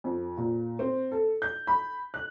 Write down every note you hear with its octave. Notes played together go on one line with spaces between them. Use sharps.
F2
A#2
C4
A4
G6
B5
F#6